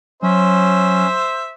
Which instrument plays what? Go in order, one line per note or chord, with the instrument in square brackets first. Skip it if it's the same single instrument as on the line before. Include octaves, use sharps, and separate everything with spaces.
[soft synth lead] F#3 [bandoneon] C#4 [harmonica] C5 E5